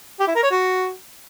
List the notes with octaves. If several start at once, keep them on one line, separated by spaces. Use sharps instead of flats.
G4
E4
A#4
C#5
F#4